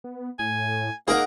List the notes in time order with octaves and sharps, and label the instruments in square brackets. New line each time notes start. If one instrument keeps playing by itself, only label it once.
[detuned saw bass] B3
[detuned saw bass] A2 [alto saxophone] G#5
[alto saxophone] A#3 [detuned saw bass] D#4 [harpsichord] G#4 A#4 [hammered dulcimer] F#5 D6